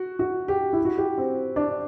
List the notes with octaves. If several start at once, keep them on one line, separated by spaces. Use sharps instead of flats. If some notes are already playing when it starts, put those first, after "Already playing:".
Already playing: F#4
F#4
G4
E4
F#4
G4
C4
D4